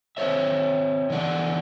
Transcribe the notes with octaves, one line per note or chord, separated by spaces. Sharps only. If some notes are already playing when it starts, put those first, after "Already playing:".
C4 C5 C#5 E5
D3 E3 B3 D5 F#5